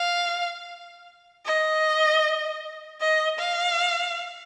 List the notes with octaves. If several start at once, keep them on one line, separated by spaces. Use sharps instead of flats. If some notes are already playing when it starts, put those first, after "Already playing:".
Already playing: F5
D#5
D#5
F5